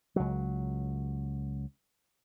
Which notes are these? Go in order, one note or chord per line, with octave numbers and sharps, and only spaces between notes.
C#2 F#3